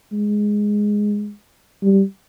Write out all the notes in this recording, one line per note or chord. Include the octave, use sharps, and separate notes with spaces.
G#3
G3